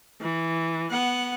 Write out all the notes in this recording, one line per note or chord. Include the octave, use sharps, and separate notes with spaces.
E3
B3 F#5